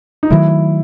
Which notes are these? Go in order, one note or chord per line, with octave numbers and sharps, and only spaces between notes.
D#4
D#3 F#3 A3 E4